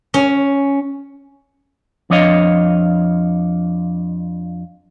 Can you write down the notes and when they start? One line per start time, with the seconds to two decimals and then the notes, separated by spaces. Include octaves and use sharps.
0.14 C#4
2.10 F2 F3 D4 C#5 D#5 F5